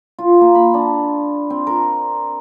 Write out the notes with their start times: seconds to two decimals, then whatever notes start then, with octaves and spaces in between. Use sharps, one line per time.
0.19 F4
0.41 A#3
0.55 B5
0.74 D4
1.50 C4
1.67 A#4